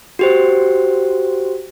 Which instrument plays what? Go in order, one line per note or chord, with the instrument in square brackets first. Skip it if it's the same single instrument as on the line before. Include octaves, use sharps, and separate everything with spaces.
[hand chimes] F#4 G4 C5